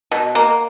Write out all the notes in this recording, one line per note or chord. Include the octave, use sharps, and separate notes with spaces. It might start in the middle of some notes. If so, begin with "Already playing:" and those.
B2
A#3